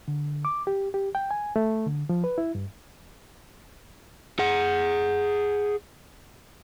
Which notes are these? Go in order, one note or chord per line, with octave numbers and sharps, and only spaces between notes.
D3
D6
G4
G4
G5
G#5
A3
D3
F3
B4
E4
G2
G#4 F#5